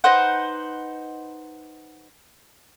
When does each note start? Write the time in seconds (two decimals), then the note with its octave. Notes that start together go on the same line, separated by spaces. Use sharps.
0.04 D#4 B4 C5 F#5